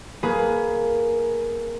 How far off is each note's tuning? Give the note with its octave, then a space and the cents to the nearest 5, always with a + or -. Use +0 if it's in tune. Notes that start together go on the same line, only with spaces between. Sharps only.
A#3 +0 G#4 +20 B4 +0